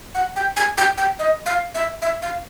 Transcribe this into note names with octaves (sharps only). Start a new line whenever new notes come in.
F#5
G5
G#5
G5
G5
D#5
F5
E5
E5
F5